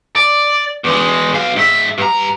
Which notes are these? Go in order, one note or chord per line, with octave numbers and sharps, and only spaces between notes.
D5
E2 G#3
B1 F5
G#2 E5
G2 A#5